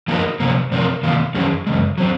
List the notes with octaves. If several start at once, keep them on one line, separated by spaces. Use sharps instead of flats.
F3 A#3 D#4 F#4 A#4
C3 F3 A#3
C3 F3 C4 F4 A#4
C3 D#3 A#3 F4
F2 D#3 F#3 C#4 G#4
F#2 C#3 G#3
F#3 C4